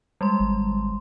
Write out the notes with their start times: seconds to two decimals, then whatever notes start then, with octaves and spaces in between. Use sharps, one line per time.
0.21 G3 G#3 C6
0.39 G#1